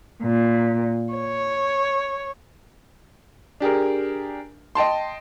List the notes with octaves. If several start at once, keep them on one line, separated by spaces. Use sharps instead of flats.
A#2
C#5
D4 G4 G#4 A#4
D#5 G5 A5 C6